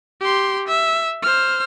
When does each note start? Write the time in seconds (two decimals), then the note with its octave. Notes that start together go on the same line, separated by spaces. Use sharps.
0.21 G4 C6
0.68 E5
1.22 C5 F6